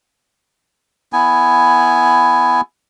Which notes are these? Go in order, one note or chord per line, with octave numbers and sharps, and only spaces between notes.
B3 E4 G#5